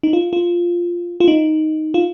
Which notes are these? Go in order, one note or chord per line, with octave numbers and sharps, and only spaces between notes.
D#4
F4
F4
F4
D#4
F4